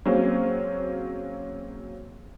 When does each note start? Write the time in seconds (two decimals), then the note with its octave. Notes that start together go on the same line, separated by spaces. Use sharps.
0.06 F#3 G#3 A#3 C4 C#4